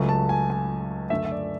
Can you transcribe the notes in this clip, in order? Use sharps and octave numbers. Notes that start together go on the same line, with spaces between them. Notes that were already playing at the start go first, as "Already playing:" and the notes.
Already playing: C#2 C#3 F#3 A3
A5
G#5
G#5
F#2 D3 A3 E5
E5
D5